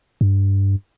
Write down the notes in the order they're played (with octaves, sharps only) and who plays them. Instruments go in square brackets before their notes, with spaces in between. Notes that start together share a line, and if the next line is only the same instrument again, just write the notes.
[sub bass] G2